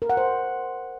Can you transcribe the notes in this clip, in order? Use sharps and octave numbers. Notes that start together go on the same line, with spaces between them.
A#4
F#5
C5